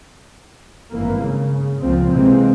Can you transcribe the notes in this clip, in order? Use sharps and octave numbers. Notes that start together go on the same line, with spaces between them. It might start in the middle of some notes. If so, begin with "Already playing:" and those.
G#1 G2 E3 A#3
C#3
C#2 A#2 F3 C4
C3 E3 G#3 A#3 C4